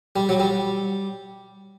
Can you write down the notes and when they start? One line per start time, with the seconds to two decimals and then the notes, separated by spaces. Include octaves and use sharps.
0.16 G3
0.29 F#3
0.40 G3